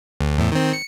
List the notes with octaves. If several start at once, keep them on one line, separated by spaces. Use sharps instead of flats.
D2
E2 A2
D#3 C4
C#7